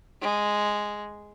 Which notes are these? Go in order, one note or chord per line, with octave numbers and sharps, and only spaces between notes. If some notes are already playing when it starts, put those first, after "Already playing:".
G#3